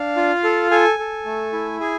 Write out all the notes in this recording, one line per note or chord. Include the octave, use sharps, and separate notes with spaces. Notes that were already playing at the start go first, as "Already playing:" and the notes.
Already playing: D4 F5
F4
A4
A4 G#5
A4
A3
E4
G#4 G#5